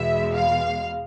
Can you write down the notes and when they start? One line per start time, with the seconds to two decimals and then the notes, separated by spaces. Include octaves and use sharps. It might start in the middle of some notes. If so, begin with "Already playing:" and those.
Already playing: E2 B2 G#3 E5
0.34 F5